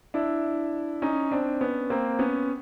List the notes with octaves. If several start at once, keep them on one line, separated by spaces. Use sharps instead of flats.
D4 E4
C#4 D#4
C4 D4
B3 C#4
A#3 C4
B3 C#4